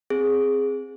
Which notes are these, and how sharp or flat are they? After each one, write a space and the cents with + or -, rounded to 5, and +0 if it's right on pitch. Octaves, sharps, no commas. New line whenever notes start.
C4 +0 G#4 +0